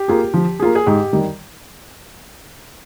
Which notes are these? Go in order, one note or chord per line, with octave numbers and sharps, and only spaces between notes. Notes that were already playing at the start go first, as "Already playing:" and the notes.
Already playing: G4
A#3 F4 G#4
F3
A#3 F4 G#4
G#4
G#2 G4
D#3 G3